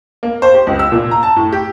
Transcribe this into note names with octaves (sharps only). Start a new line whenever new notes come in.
A#3
C5
G4
C#2
E6
A#2
A#5
A5
A2
G4